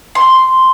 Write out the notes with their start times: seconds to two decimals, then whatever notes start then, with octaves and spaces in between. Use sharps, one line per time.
0.15 C6